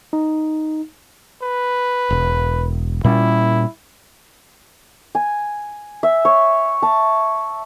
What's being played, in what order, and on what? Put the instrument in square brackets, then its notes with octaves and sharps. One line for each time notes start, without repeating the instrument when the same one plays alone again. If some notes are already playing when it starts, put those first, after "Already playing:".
[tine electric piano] D#4
[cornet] B4
[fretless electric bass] E1
[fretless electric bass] A#2 G3 C#4 [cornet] E4
[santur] G#5
E5
C#5
A5